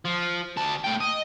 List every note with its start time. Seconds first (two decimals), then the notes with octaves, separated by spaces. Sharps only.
0.05 F3
0.57 D2 A5
0.84 A3 G5
1.00 D#5